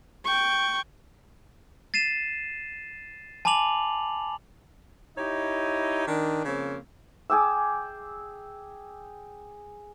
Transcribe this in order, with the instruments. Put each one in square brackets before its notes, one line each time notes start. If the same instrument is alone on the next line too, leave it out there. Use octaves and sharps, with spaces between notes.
[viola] G5 C#6
[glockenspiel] A6 C7 D#7 E7
G#5 A5 B5 D6 F7 F#7
[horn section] D#4 E4 G4 C#5 D#5
D#3 D4
C#3 F3 A#3 C4 C#5
[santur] G#4 G5 D6 E6